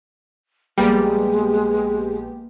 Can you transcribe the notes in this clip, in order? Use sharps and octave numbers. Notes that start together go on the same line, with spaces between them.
A#1 G3 G#3 A#3 B3 G4